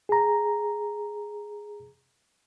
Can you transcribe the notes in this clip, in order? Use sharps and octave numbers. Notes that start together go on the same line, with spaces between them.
G#4 A#5